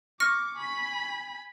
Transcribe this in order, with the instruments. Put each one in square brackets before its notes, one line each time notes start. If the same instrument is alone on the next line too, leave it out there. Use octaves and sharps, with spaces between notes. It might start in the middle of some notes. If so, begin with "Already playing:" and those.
[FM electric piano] C#6 [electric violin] D6 [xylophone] F6 A#6
[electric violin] G#5 B5